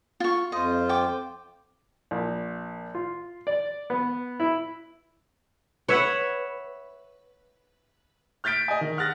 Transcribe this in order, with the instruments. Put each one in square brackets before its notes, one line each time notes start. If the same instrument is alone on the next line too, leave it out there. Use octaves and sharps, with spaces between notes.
[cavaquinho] F4 C#6
[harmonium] F2 F4 C5 [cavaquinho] D#5
[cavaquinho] G5 D6
[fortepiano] A#1
F4
D5
B3
E4
[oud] B4 [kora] C#5 E5 F#5
[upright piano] F6 G6 A6 B6 D7
D#5 G#5
D#3
F#5 F6 F#6 A6 A#6